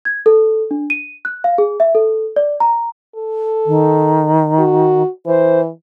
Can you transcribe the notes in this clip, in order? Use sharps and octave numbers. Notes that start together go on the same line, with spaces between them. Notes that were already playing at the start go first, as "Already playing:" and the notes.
G#6
A4
D4
D#7
F#6
F5
G#4
E5
A4
D5
A#5
A4
D#3
F#4
E3 C5